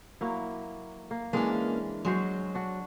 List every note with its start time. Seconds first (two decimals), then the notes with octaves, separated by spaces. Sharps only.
0.21 F#3 A#3 E4
1.11 A#3
1.33 E3 G#3 A#3 C#4 D4
2.05 F#3 G#3 F#4 C5
2.55 D4 F#4